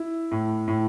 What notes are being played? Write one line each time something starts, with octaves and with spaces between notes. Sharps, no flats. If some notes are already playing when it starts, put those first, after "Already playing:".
Already playing: E4
A2
A2